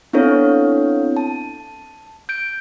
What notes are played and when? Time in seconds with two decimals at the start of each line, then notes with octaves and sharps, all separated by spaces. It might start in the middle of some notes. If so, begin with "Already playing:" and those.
0.13 B3 C4 D4 E4 A4 C#5
1.17 A5
2.29 G6 D7